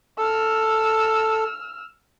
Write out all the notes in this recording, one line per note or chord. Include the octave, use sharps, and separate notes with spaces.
A4 E6 F6